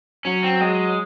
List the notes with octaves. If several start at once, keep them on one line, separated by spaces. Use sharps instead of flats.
F#3 C#4
C4
G#3